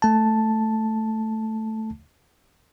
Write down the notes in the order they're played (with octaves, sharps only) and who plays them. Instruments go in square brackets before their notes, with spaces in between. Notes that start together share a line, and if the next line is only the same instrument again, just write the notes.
[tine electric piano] A3 A5